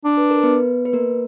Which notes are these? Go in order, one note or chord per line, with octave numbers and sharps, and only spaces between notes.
D4
B4
A#4
B3 B4
B4
A#3 A#4